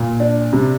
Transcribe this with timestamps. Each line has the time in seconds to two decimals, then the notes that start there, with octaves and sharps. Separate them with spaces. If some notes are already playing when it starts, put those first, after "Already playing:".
Already playing: A#2
0.20 D4
0.53 C3